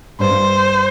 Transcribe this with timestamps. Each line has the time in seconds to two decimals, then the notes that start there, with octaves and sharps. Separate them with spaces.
0.20 G2 C5